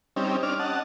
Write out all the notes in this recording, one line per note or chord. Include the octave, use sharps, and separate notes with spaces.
G3 C4 C#4 D#4
C#4 D4 D6 F6
D#5 F#5 A5